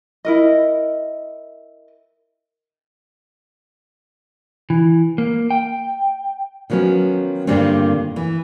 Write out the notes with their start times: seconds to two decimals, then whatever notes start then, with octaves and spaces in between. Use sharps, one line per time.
0.25 E4 A#4 D#5
4.70 E3
5.18 A#3
5.50 G5
6.70 D#3 F3 F#3 B3 C#4
7.47 G2 A#2 D3 D#3 G3 C4
8.16 E3